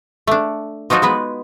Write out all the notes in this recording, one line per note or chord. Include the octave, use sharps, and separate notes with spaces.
A3 D4
F3 F#3 D#4 F4 F#4
G#3 B3 B4